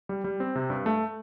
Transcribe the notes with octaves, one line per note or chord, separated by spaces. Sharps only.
G3
G3
C4
C3
G2
A3